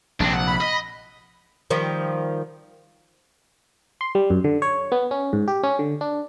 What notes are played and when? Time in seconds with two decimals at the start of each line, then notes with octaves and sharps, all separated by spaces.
0.20 A#1 C3 C4 D4
0.33 F#5
0.47 B5
0.60 D#5
1.70 D#3 F3 G3
4.01 C6
4.15 G3
4.30 F#2
4.44 D3
4.62 C#5
4.92 B3
5.11 C#4
5.33 G#2
5.48 G4
5.63 C#4
5.79 D3
6.01 D4